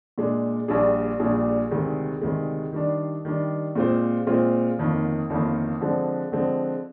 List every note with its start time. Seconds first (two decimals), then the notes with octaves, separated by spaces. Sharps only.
0.18 A#2 G#3 D4
0.68 A#1 A#2 G3 D4 G#4
1.20 A#1 A#2 G3 D4 G#4
1.71 D2 C3 D#3 G#3
2.22 D2 C3 D#3 G#3
2.73 D#3 G3 D4
3.25 D#3 G3 D4
3.75 A#2 G#3 C4 F4 C5
4.27 A#2 G#3 C4 F4 C5
4.78 G1 F2 D#3 A#3
5.30 G1 F2 D#3 A#3
5.81 D3 F3 G#3 C4
6.32 D3 F3 G#3 C4